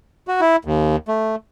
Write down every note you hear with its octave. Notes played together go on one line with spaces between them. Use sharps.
F#4
E4
D#2
A3